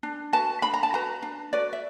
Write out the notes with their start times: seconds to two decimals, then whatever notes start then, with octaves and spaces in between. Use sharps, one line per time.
0.03 D4
0.33 F#4 B4 A5
0.62 D4 B5
0.74 A#5
0.83 A5
0.93 F#4 B4 A#5
1.22 D4
1.53 F#4 B4 D5
1.73 E5